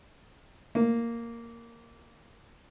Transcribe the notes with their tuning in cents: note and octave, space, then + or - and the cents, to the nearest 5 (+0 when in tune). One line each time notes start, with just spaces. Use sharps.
A#3 -5